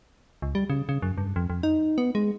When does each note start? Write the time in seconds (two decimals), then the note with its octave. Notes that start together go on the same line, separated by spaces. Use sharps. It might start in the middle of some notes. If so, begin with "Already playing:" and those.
0.42 C#2
0.55 G3
0.70 C#3
0.89 C#3
1.02 F#2
1.18 G2
1.36 F2
1.50 F2
1.63 D#4
1.98 B3
2.15 G#3